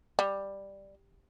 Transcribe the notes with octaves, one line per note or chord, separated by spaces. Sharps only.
G3